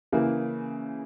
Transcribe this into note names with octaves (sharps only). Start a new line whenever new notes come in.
C#3 E3 A#3